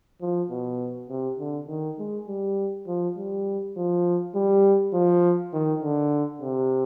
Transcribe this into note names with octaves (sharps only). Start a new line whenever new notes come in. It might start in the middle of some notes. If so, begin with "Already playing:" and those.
F3
B2
C3
D3
D#3
G#3
G3
F3
G3
F3
G3
F3
D#3
D3
C3